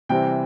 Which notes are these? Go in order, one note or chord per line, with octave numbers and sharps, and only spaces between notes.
C3 E3 G3 C4 G5